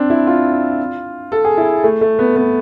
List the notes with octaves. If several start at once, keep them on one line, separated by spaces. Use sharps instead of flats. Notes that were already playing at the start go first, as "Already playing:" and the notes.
Already playing: C4 D4
E4
F4
A4
G#4
E4
A3
A3
B3
B3